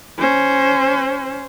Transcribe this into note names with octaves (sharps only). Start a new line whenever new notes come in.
C#4 C5